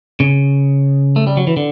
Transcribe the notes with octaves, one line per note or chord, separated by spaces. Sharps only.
C#3
A3
G3
F#3
E3
D3